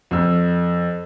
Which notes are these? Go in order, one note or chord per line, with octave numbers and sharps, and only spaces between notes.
F2 E6